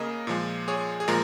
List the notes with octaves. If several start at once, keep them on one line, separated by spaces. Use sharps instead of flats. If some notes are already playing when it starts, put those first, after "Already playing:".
Already playing: C#3 A#3 G#4 A#4 D#5
A#2 F3 G#3
G#4 C#5
G#4
A#2 F3 G#3 A#4